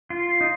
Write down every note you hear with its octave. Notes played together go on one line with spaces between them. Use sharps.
F4
D#4